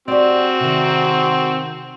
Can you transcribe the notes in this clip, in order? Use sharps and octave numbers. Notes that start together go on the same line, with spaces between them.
C4 F#4 G4 D5
C3 D#3